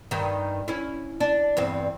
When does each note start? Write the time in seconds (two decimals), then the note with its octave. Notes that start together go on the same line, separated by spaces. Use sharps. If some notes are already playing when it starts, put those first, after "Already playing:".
0.11 G2 D#3
0.68 C#4 E4
1.20 D4
1.57 E2 G2 C4